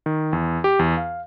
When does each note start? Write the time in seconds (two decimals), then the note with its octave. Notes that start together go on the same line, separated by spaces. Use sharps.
0.06 D#3
0.33 E2
0.64 G4
0.79 E2
0.97 F5